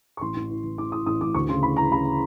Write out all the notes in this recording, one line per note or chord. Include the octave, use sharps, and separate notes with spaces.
C#6
A1 C6
A1
E3
E3
A1 D6
A2 D#6
A1 D#6
A1 D6
D2 C#6
C#3 C6
E3 B5
E3 A#5
C#3 B5